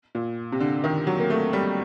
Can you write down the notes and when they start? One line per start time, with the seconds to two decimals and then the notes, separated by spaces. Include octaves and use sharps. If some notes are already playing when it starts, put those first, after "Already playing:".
0.15 A#2
0.52 C3
0.60 D3
0.84 D#3
1.07 F#3
1.20 A#3
1.30 A3
1.53 G3